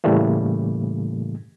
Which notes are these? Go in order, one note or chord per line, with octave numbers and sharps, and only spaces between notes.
A2 C#3 E3 G3 A3 A#3